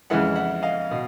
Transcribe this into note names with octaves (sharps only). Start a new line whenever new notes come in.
F2 C#3 E3 G#3 E5 F#5
E5 F#5
D#5 F5
B2